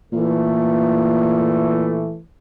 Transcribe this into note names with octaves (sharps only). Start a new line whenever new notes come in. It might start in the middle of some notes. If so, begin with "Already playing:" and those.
A#2 E3 A3